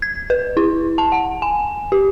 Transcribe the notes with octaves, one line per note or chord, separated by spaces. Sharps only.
G#6
B4
E4
A5
F#5
G#5
G4